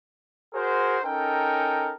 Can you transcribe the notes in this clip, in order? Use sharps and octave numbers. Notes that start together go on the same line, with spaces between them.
F#4 G#4 A#4 C5
C#4 D#4 A4 A#4 G5